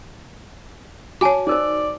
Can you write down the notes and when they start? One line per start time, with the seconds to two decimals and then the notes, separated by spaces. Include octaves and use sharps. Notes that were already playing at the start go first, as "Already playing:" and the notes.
1.21 F#4 C#5 G#5 A5 D6
1.47 D#4 A#4 C5 D5